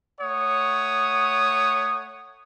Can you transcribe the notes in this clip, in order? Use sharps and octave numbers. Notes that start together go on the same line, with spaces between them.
A3 C#5 F#5 D#6